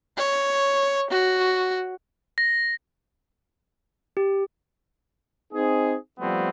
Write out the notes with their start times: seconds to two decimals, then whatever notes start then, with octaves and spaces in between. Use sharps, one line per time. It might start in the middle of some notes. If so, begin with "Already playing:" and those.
0.17 C#5
1.10 F#4
2.38 A#6
4.17 G4
5.53 C4 D#4 G#4
6.20 F3 G3 A3 B3 C4